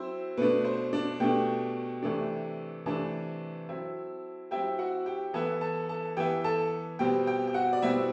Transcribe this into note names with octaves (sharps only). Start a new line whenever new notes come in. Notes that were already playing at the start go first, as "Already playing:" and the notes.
Already playing: F#3 C4 E4 C5
B2 A3 D4 B4
C5
D4 D5
B2 A3 D4 G4 G5
C3 E3 A3 D4
C3 E3 A3 D4 A4 A5
F#3 C4 E4
F#3 C4 E4 G4 G5
F#4 F#5
G4 G5
E3 B3 E4 A4 A5
A4 A5
A4 A5
E3 B3 E4 G4 G5
A4 A5
B2 G3 C4 G4 G5
G4 G5
G5
F#4 F#5
D5
B2 G3 C4 E4 E5